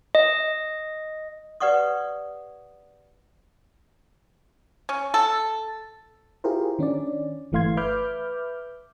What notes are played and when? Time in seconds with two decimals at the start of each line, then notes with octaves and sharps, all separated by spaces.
0.15 D#5
1.60 G4 B4 D5 F#5 C#6 D#6
4.89 C#4
5.14 A4
6.44 E4 F4 G4 G#4 A#4 C5
6.79 D#3 C#4 D4 D5
7.52 G1 E3 A3 F5 C6 G#6
7.77 B4 E5 B5 D6 F6 G6